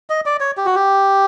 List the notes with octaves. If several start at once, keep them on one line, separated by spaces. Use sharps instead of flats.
D#5
D5
C#5
G4
F#4
G4